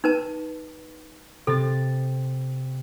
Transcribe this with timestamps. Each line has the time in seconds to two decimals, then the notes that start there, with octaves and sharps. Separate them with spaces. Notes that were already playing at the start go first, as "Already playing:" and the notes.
0.04 D#4 B4 A5
1.47 C3 A4 A6